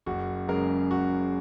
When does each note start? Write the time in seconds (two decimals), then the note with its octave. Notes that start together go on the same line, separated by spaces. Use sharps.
0.06 F#1 F#4
0.48 F#2 C#3 G#3 A#4
0.91 F#4